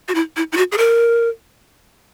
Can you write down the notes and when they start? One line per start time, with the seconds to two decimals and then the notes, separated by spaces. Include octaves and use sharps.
0.08 F#4
0.15 E4
0.37 E4
0.52 E4
0.57 F#4
0.72 G#4
0.78 A#4